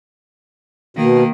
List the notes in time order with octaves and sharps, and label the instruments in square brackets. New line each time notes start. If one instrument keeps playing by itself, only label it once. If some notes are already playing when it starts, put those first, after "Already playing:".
[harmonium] B2 [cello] D#3 A#3